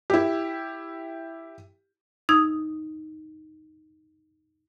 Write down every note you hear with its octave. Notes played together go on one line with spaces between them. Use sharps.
E4 G4
D#4 D#6 E6 G#6